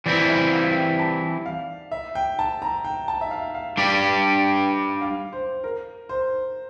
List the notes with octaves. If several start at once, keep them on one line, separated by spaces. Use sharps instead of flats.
E3 G3 C4 E4 D5
E5
F5
G5
A5
F5
E5
G5
A5
A#5
G5
A5
E5
F5
F5
G3 D4 G4 D5 F5
G5
F5
C5
A#4
C5